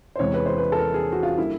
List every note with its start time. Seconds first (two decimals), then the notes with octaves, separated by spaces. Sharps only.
0.16 C5
0.19 E2 C3 E3 G#3 C#5
0.34 B4
0.46 C5
0.58 B4
0.72 A4
0.78 A#4
0.94 G#4
1.12 F#4
1.23 F4
1.38 D3 G3 A#3 E4